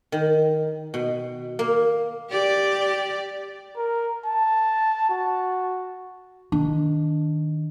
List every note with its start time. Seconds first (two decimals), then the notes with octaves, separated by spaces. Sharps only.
0.12 D#3
0.94 B2
1.59 A#3
2.30 G4 D5
3.76 A#4
4.26 A5
5.10 F#4
6.52 D#3 D4